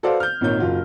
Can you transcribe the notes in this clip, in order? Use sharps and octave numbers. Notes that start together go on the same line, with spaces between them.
F#4 A4 B4 C5 D5 F5
F6 G6
G#1 A#2 D#4 C#5 G6
F#1 F4 F#4